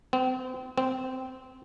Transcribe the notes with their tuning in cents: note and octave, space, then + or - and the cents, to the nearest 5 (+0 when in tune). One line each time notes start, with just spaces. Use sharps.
C4 -35
C4 -15